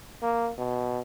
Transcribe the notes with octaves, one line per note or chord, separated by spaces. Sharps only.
A#3
B2